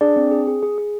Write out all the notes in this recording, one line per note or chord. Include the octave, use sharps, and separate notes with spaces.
D4 G#4 D5
C4
G#4
G#4
G#4
G#4